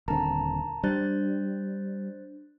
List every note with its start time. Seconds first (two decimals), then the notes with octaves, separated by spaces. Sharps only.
0.08 D#1 D3 C4 A#4 A5 A#5
0.83 G3 D4 C5 F#6 A6